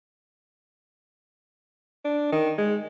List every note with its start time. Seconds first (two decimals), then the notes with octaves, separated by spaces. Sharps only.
2.05 D4
2.32 D#3
2.58 G#3